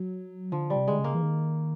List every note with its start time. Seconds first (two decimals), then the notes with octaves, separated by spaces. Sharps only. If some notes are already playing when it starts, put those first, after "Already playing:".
Already playing: F#3
0.52 D3 F3
0.70 G3
0.76 C3
0.88 D3 G#3
0.99 C#3
1.04 A#3
1.15 E3
1.22 D#3